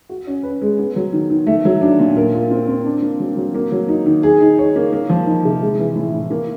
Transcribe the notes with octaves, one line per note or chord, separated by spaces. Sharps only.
F#4
C#4
B4
G#3
B3
F#3
D#3
D#3
A3
F#3
D4
A#2
A#4
F4
C4
C4
D4
A#3
F#3
F#3
A#3
F#3
D#4
D#3
G#4
D#4
C#5
A#3
A#3
F3
D#4
C3
G#3
E3
A2
A2
A#3